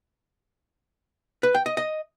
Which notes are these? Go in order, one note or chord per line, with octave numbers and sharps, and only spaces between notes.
B4
G5
D#5
D#5